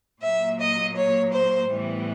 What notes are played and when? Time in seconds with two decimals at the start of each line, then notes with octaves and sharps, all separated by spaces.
0.22 A#2 F#3 A#3 E5
0.60 D#5
0.97 C#5
1.33 C5
1.70 A2 E3 G3 B3